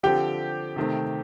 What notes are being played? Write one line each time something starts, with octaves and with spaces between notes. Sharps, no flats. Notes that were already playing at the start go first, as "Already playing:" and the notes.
D3 F3 C4 G4 G5
C3 D#3 A3 C4